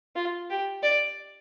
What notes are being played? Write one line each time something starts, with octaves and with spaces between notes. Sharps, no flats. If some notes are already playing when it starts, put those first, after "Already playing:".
F4
G4
D5